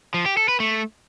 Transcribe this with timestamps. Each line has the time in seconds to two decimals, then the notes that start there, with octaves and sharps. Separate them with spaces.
0.14 F3
0.26 G4
0.37 A4
0.48 B4
0.60 A3